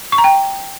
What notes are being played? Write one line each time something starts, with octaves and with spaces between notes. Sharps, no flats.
C#6
A#5
G5